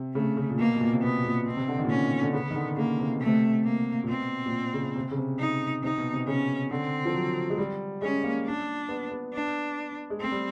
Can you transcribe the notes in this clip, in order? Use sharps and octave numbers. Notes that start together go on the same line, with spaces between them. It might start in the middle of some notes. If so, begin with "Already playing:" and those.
Already playing: C3
C#3 A3
C#3
A#2
B2 A#3
B2
A#2
C3
B2 B3
A#2
B2 C4
C3
D3
D#3
A#2
B2 C#4
D3
C#3 B3
D#3
D3
C#3 A#3
C3
B2
A3
C3
A#3
A#2
B2 C4
A#2
B2
C#3
C3
C#3
C3
D#4
C3 D#4
B2
C3
C#3 C#4
D3 C4
F3
F#3
G#3
G3
G#3 C#4
A#3
D4
B3
B3
D4
G#3
A3 C4
G3